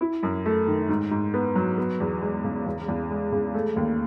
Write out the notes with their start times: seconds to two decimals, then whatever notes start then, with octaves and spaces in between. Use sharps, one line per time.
0.01 E4
0.23 F#2
0.46 A3
0.67 D#3
0.89 G#2
1.11 G#2
1.34 B3
1.56 F#3
1.78 B3
2.00 E2
2.22 G#3
2.44 C#3
2.66 E2
2.88 E2
3.10 G#3
3.32 C#3
3.54 A3
3.76 D#2